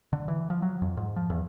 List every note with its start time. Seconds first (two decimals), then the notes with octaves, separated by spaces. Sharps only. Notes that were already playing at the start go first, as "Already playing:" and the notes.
0.13 D3
0.28 E3
0.50 F3
0.62 F#3
0.82 F2
0.97 G#2
1.16 F3
1.30 E2